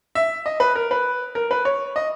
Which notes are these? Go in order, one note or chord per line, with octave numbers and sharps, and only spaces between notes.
E5
D#5
B4
A#4
B4
A#4
B4
C#5
D#5